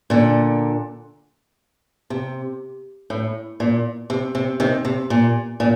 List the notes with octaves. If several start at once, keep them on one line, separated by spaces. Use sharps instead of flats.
A#2 D3
C3
A2
A#2
C3
C3
C3 D#3
C3
A#2
A#2